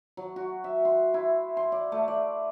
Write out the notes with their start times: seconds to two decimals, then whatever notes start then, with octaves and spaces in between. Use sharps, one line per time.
0.17 F#3
0.36 F#4
0.64 E5
0.85 C6
1.14 E4
1.57 C6
1.72 D5
1.92 A3
2.08 D5